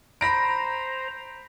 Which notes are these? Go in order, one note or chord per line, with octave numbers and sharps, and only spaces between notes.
C5 A#5 B5 A#6 D7